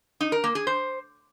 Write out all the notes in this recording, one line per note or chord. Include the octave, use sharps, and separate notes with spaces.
D#4
A#4
A#3
G#4
C5